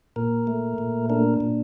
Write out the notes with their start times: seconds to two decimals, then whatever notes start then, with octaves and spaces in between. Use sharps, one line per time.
0.16 A#2 A#4
0.47 A3
0.78 A#2
1.10 D4 A#4
1.40 A#2